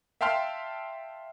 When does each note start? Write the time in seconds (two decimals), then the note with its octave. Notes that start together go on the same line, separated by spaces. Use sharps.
0.21 E5 F5 G5 A5 C6 F6